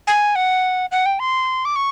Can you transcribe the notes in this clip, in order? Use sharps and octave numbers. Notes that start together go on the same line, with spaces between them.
G#5
F#5
F#5
G5
C6
D6
C#6